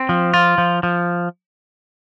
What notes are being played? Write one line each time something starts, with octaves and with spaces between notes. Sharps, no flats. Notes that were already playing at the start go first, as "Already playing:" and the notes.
Already playing: C4
F3
F4
F3
F3